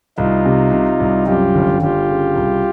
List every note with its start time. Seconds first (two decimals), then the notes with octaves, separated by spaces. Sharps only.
0.18 C2 D#4 F4
0.46 C3
0.72 C3
1.00 C2
1.27 F#2 F4 G4
1.55 G1
1.81 G1 F4 G4
2.08 C#3
2.36 C2